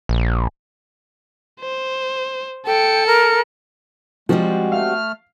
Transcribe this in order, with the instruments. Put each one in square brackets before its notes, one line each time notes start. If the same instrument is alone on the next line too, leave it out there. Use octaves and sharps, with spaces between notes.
[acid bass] A#1
[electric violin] C5
[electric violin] A4 C#7 [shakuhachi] G5
[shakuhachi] A#4
[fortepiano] F3 [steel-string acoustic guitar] G3 C4 F#4 [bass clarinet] G#3
[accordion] A3 F6 [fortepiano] F5